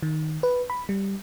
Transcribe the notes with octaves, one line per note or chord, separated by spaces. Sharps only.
D#3
B4
B5
G3